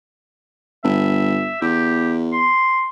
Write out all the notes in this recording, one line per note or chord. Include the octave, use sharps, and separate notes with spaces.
G1 E5
E2 G4
C6